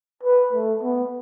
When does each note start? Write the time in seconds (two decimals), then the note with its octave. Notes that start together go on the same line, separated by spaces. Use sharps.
0.23 B4
0.53 A3
0.82 B3